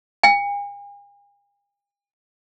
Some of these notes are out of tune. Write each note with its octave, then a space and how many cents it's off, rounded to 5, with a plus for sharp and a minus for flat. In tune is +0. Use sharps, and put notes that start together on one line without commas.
G#5 -45